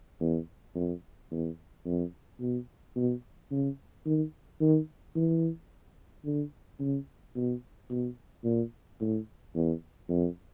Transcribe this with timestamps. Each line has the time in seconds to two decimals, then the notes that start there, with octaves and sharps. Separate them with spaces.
0.21 E2
0.75 F2
1.31 E2
1.86 F2
2.40 B2
2.96 B2
3.51 C#3
4.06 D#3
4.61 D#3
5.16 E3
6.25 D3
6.80 C#3
7.36 B2
7.90 B2
8.44 A#2
9.00 A2
9.55 E2
10.09 F2